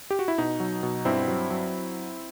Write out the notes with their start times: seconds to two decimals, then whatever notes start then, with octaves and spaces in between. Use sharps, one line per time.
0.11 G4
0.19 F#4
0.28 E4
0.38 B2 D#4
0.60 F#3
0.83 B2
1.05 G2 C4 E4
1.28 F#3
1.50 F#3